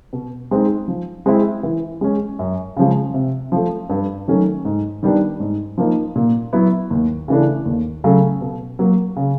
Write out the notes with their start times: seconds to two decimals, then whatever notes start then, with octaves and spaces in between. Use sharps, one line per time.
0.13 B2
0.51 G#3 C4 D#4
0.88 F3
1.26 G#3 C4 E4
1.63 E3
2.01 G#3 C#4
2.39 F#2
2.77 C#3 F3 G#3
3.14 C3
3.52 F3 A3
3.90 G2
4.28 D#3 F#3 A3 C#4
4.65 G#2
5.03 D#3 G3 B3 D4
5.40 G#2
5.78 F3 A#3 D#4
6.16 A#2
6.53 F#3 B3 E4
6.91 D#2
7.28 C#3 E3 A3 D4
7.65 D#2
8.04 C#3 F#3 A3
8.41 B2
8.79 F#3 A#3
9.16 C#3